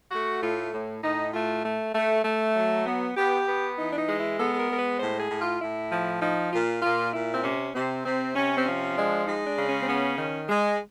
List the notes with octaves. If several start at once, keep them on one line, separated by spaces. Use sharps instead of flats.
A3 F#4
A2 F4
A2
A2 D#4
A3 F4
A3
A3
A3
F#3
B3
B3 G4
B3
E3 D#4
D4
D#4
G#3
E4
B3 A4
A4
A#4
G#3 A#4
B4
A2 C5
G#4
A2
F4
A2 E4
F3
F3 D#4
A#2 F4
A#2 F4
A#2 E4
C4
C3 C#4
C3 C4
C3 C4
C3 C#4
C4
F3 C#4
G#3 D4
G#3 D#4
D4
C#3
C#4
C4
B3 C#4
D#3
G#3